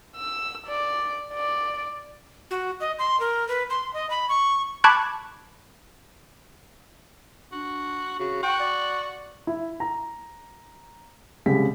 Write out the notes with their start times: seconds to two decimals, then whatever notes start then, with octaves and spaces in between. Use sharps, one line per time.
0.17 E6
0.67 D5
1.34 D5
2.50 F#4
2.80 D#5
2.99 C6
3.20 A#4
3.48 B4
3.70 C6
3.93 D#5
4.10 B5
4.29 C#6
4.84 A5 B5 C#6 D6 F#6 G#6
7.52 D4 F#4
8.20 C#3 F#4
8.43 F#4 G5
8.60 D5
9.47 E4
9.80 A#5
11.46 C2 C#3 G3 G#3 B6